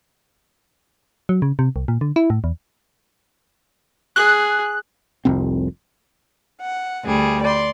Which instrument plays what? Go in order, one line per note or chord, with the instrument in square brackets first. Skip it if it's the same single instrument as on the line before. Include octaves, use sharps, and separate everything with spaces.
[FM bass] F#3
C#3
C3
C2
A#2
D3
E4
A2
E2
[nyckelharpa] G#4 [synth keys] F#6
[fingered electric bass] F1 C2 C4
[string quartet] F#5
D2 G3 G#4
D5 C6